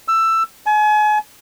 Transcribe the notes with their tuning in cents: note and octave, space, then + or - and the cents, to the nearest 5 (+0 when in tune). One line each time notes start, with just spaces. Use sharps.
E6 +15
G#5 +35